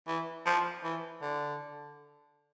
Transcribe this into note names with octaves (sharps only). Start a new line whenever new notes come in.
E3
F3
E3
D3